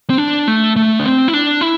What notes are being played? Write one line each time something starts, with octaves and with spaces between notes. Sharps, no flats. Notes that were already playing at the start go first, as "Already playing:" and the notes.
C4
D4
A3
A3
D4
C4
E4
D4
E4